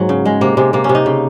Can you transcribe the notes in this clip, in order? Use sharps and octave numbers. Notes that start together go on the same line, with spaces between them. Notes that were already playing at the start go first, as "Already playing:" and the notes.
Already playing: G#2 F#3 A#3
C#3
G#3
C3 A#3
C3 G#3
C3 A#3
C#4
C3
D#4
C#3